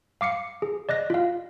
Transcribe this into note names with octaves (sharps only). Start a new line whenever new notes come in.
F5 D6 C7 C#7
G#4
D5 D#5 F#6 A#6
F4 F5